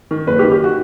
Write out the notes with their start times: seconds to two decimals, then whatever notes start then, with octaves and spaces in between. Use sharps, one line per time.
0.11 D#3
0.27 F#1 B4
0.39 G4
0.43 D#3
0.52 G4
0.64 F#4